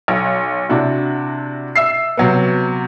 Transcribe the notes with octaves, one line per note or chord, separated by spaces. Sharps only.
B1
C3 D4 E4 F#4
E5 E6 C7
C3 F#3 B3